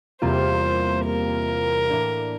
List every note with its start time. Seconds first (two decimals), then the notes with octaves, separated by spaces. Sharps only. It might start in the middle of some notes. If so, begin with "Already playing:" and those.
0.22 E2 C3 G3 A#3 F4 C5
1.06 A#4
1.90 A2 E3 A#3 D4